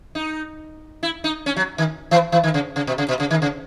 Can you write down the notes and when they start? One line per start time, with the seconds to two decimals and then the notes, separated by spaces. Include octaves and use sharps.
0.15 D#4
1.03 E4
1.24 D#4
1.46 C#4
1.56 F#3
1.78 D#3
2.11 E3
2.32 E3
2.44 D#3
2.54 C#3
2.76 C#3
2.87 B2
2.98 C#3
3.08 B2
3.20 C#3
3.31 D#3
3.42 C#3